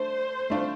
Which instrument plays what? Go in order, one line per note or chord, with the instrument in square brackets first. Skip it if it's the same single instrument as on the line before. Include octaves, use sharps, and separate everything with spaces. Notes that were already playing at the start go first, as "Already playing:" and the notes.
Already playing: [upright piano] A3 D4 [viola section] C5
[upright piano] A3 D4 F4